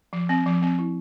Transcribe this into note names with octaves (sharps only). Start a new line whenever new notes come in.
F3
C4
F3
C4
E4